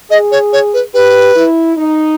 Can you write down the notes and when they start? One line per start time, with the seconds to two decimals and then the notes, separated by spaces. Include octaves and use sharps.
0.10 G#4 D#5
0.32 C#5
0.53 C#5
0.74 B4
0.94 G4 B4
1.35 E4
1.76 D#4